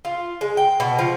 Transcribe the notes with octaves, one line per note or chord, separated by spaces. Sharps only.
F4
G#3
G5
B2
F3